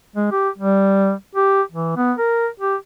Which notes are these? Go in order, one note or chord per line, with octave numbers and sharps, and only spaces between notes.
G#3
G4
G3
G4
E3
B3
A#4
G4